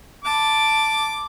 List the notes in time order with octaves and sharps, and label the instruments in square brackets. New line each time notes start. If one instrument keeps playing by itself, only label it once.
[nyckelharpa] A5 B5 [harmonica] D6